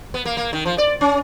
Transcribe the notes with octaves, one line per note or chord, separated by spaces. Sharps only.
B3
A#3
A#3
D#3
F3
D5
C#4